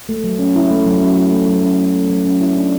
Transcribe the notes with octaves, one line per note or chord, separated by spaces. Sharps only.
A3
F#3
C#4
E4
A3
F#3
C#4
E4
A3
F#3
C#4
E4
A3
F#3
C#4
E4
D4